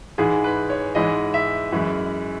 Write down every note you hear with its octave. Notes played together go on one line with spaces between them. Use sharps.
G#2 E3 G#3 G#4
B4
C#5
G#2 E3 G#3 D#5
E5
F#2 E3 G#3